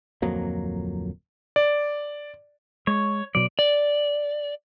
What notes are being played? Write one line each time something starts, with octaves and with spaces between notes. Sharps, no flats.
D1 F2 F#3 A#3
D5
G#3 C#5
B2 F#3 D5
D5